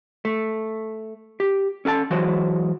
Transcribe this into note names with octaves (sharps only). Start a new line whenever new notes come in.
A3
G4
C#4 A4 F5 A5
E3 F#3 G#3 F#4 C5